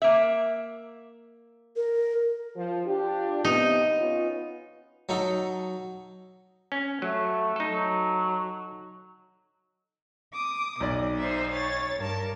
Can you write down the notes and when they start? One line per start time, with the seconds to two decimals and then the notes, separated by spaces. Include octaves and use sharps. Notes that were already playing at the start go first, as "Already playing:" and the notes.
0.02 A#3 E5
1.76 A#4
2.56 F3
2.86 D4 F4 G4
3.45 C3 B3 D#4
3.98 B3 C#4 F4
5.09 F#3 D#4 A4
6.72 C#4
7.02 F#3 A3
7.56 D#4 A4
7.71 F#3
10.32 D6 D#6
10.81 B1 B2 D5
11.16 D#4 C5 E5
11.52 C#5 A6
11.97 G2 A#4 A5